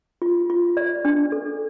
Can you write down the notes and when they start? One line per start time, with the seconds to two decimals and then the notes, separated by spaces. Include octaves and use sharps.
0.22 F4
0.50 F4
0.77 D5
1.05 D4
1.32 A4